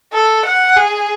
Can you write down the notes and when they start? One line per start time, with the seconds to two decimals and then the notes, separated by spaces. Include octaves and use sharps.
0.13 A4
0.45 F#5
0.76 G#4